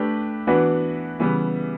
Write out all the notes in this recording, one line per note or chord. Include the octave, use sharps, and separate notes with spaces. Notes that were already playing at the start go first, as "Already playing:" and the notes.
Already playing: A3 D4 G4 B4
E3 B3 D4 F#4 B4
C#3 E3 G3 B3